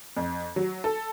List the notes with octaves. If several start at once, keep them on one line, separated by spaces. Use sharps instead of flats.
F2
F#3
A4